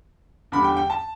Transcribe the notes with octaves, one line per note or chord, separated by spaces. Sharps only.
E2 D3 G3 B5
G5
G5
A5